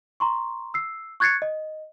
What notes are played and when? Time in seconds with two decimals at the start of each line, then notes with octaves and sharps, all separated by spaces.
0.20 A#5 C6 C#6
0.74 E6 C7
1.20 C#6 F#6 G#6 A6 C7 C#7
1.42 D#5